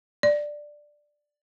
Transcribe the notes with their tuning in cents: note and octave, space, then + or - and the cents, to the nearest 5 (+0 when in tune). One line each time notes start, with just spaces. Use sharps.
D5 +10